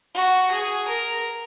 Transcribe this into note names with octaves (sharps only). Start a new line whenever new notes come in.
F#4
G#4
A#4